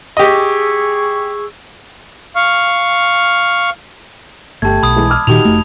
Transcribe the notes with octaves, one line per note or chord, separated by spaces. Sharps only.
G4 G#4 D#5 C#6 E6
F5 C#6 F6
G1 A3 G4 G5 A5 G#6
B1 B5 D#6
E3 G#3 G#4
D6 E6 F6
A#2 D#3 D#4 F#4 G4 F7
F1 A3